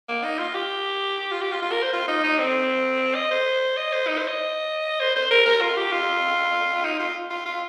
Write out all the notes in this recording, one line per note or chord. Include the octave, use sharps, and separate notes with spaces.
A#3
D#4
F4
G4
F4
G4
F4
F4
A#4
C5
F4
D#4
D#4
C4
D#5
C5
D#5
C5
D#4
C5
D#5
C5
C5
A#4
A#4
F4
G4
F4
D#4
F4
F4
F4